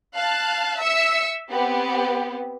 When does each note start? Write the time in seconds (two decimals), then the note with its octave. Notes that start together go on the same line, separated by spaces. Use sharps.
0.16 F5 A5 F#6
0.81 E5 E6 B6 C#7
1.50 B3 C4 G4